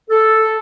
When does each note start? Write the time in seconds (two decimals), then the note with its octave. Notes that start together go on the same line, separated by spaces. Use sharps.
0.10 A4